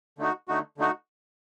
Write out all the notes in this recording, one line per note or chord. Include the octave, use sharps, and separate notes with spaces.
D3 A3 D#4 F#4
D3 A3 D#4 F#4
D3 A3 D#4 F#4